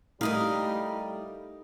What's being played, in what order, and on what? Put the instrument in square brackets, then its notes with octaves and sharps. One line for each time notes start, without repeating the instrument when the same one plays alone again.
[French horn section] G3 [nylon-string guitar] A3 E4 [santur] D#4 [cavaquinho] A#4 D#5 F5